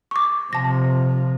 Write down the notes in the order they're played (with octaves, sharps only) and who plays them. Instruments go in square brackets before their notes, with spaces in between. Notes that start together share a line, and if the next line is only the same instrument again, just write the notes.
[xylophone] C#6 D6
[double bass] C3 F3 [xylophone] A5 A#6